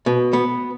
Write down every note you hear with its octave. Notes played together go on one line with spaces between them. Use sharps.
B2
B3